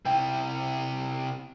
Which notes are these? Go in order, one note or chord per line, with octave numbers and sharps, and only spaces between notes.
C3 E4 G5